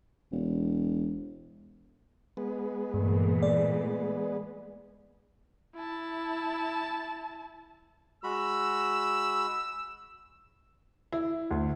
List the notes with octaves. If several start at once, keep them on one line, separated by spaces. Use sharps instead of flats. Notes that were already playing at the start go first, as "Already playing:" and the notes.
E1
G#3 B3
G2 A#2 E3 A3
D5
E4 A5
G#3 F#4 B5 E6
E4
D2